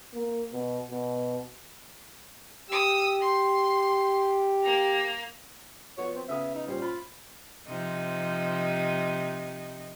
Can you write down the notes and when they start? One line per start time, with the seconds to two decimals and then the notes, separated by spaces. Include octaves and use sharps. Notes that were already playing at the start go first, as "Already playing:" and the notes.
0.14 A#3
0.53 B2
0.91 B2
2.70 G4 D#6 E6
3.21 C6
4.63 A#3 A#5
5.98 F3 B3 F#4 C#5
6.16 C4
6.29 C#3 B3 E5 D#6
6.55 D#4
6.67 A#2 G3 C#4 C5
6.82 F4 B5
7.68 C3 F3 D#4